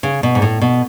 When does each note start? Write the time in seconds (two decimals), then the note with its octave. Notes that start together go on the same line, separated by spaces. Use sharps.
0.03 C#3
0.23 B2
0.35 G#2
0.42 A2
0.61 B2